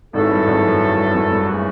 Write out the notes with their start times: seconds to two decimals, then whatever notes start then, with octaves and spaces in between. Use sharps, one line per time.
0.13 G#1 G#2 E3 A3 C#4 F#4 A4
0.31 G2
0.47 G#1 G#2
0.64 F#2
0.80 G2
0.98 G2
1.14 F#2
1.31 G2
1.48 C#3 E3 A3 C#4 F#4